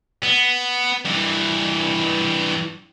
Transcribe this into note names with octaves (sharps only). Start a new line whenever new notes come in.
B3
G2 E3